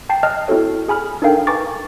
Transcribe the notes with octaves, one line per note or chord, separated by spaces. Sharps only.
G5 A5 C7
D#5 A5 F6 F#6
C4 E4 F#4 A4 C#5
G#4 G#5 B5 F6
D4 D#4 A4 A#4 F5 G5
B4 G#5 A#5 C#6 D6 A6